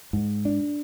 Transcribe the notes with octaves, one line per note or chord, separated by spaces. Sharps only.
G#2
D4